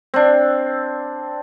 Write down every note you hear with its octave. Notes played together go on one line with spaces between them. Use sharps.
C4 D4